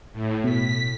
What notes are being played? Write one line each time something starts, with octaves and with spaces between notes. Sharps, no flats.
A2
B2 B6